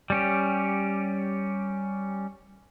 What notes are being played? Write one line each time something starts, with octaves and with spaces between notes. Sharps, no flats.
G3 C#4 G4